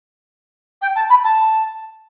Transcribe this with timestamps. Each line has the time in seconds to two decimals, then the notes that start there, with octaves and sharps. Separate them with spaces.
0.82 G5
0.96 A5
1.10 B5
1.24 A5